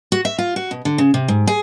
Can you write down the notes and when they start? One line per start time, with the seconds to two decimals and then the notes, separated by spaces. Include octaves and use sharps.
0.12 F#4
0.25 E5
0.39 F4
0.56 F#4
0.71 B2
0.85 D3
0.98 C#3
1.14 C3
1.28 G#2
1.47 G#4